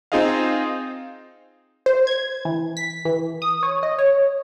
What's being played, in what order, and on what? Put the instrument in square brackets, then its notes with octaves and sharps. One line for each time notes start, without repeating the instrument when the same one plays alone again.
[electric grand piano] C4 D#4 F4 G#4 D#5 F5
[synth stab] C5
G#6
E3
B6
E3
D#6
C#5
D#5
C#5